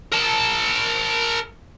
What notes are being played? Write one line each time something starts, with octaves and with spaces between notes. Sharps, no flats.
A#4 A5